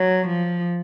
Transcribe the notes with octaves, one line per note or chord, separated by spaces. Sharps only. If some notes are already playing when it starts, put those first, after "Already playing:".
Already playing: F#3
F3